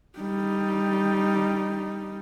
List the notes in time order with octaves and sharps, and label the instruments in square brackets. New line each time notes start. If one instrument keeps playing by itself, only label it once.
[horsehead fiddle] G3 D#4